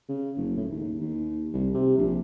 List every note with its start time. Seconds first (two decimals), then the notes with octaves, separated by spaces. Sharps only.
0.09 C#3
0.37 F#1
0.57 A2
0.70 D#2
1.00 D#2
1.53 C2
1.74 C3
1.98 A#1